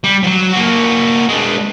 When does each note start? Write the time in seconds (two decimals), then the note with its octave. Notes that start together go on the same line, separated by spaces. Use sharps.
0.04 G3
0.23 F3 F#3
0.53 A#3 F#4
1.29 G#3 D4